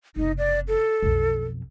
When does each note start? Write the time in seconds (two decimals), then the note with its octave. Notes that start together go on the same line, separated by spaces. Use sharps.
0.16 F#1 C3 D#4
0.38 D5
0.68 A4
1.03 B1 F2